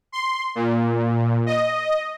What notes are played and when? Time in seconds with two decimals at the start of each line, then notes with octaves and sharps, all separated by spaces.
0.12 C6
0.55 A#2
1.46 D#5